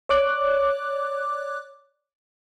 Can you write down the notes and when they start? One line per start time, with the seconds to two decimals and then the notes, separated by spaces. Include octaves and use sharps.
0.09 C#5 D5 D6 F#6